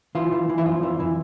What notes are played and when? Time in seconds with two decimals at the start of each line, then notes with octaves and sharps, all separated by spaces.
0.15 E3 F4
0.32 E3
0.49 E3
0.58 E4
0.66 F2 F4
0.83 E3
1.00 E3